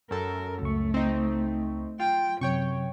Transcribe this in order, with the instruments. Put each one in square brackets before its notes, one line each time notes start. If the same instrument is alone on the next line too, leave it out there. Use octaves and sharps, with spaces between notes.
[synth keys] F#2 A4 [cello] A#4
[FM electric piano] C#2 C#6 [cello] A3
[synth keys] C4 D#4
[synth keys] F4 [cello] G5
[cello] F#2 [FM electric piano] C3 [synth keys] C#5 G5 C#6